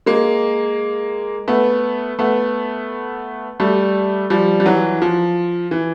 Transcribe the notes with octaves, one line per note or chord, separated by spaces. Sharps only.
G#3 A#3
A3 B3
A3 B3
G3 A3
F3 G3
G3
E3 F#3
F3
E3